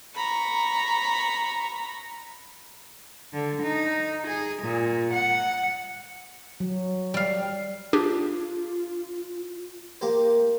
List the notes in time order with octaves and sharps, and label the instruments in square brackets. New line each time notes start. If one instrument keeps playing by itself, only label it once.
[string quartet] A#5 B5 C#6
D3
D#4
G#4
A#2
F#5
[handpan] F#3
[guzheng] G3 F5
[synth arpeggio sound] D4 G4 G#4 [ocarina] F4
[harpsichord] A#3 G4 C5